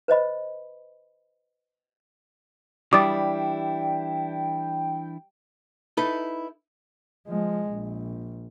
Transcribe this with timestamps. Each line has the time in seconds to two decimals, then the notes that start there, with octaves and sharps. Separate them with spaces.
0.08 B4 C5 D#5 B5
2.93 E3 G3 D4 E4 G5 D6 D#6 A6
5.97 D#4 E4 A4 B4
7.28 F3 G#3
7.71 A#1